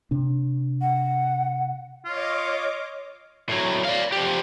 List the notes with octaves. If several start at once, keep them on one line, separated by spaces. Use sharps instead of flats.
C3 D4
F#5
F4 C#5 D#5 D6
A2 F#3
D5 F5
F3 G4